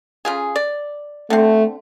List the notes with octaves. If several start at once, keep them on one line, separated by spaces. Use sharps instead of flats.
C#3 F4 G#4
D5
D3 A3 C4